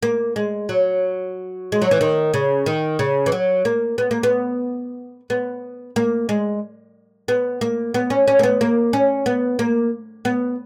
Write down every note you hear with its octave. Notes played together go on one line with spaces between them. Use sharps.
A#3
G#3
F#3
G#3
F#3
E3
D#3
C#3
D#3
C#3
E3
F#3
A#3
B3
A#3
B3
B3
A#3
G#3
B3
A#3
B3
C#4
C#4
A#3
B3
A#3
C#4
B3
A#3
B3